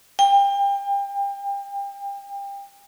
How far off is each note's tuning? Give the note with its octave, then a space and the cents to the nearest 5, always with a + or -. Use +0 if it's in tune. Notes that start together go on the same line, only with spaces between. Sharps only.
G5 +30